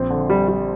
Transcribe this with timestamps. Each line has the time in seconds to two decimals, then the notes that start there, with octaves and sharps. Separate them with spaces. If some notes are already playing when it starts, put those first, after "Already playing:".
Already playing: A#1 C4
0.10 D3
0.30 G3
0.48 G3